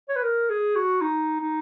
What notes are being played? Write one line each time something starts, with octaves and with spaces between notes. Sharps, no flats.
C#5
B4
A#4
G#4
F#4
D#4
D#4